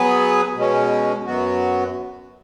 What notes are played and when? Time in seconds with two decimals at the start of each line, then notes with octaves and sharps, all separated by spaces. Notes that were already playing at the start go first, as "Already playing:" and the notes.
Already playing: F#3 B3 G#4 B4
0.55 B2 G#3 C#4
1.27 F#2 F#3 B3 F#4